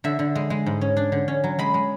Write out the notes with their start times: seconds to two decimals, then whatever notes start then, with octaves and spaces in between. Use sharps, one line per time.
0.04 D3 E5
0.19 D3
0.35 G#3
0.50 G#3
0.66 G#2
0.81 C#4
0.97 D4
1.12 D3
1.28 C#4
1.44 F#3
1.59 G#3 B5
1.74 G#3